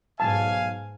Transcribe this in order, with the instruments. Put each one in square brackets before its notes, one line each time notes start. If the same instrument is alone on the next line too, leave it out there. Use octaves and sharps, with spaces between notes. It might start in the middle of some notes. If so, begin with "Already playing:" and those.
[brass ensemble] B1 F5 G#5 [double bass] G#2 [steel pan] A5